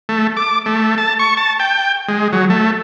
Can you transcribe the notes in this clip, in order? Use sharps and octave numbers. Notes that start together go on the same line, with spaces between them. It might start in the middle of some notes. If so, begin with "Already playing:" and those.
A3
D6
A3
A5
C#6
A5
G5
G#3
F#3
A3